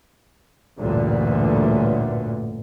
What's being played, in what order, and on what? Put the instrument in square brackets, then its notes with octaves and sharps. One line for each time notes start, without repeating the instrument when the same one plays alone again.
[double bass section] A1 D2 G2 A#2 D3